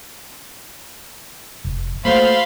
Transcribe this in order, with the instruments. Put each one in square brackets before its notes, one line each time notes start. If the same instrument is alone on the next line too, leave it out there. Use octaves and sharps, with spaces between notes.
[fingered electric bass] F1
[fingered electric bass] A3 A#3 [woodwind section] F#4 A4 C5 [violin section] F5 [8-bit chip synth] B5 C6